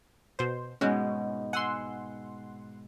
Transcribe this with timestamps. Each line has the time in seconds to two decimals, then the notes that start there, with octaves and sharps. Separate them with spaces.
0.39 B2 C5
0.81 G#2 B2 G#3 C#4 F#4
1.53 F#5 G#5 C6 E6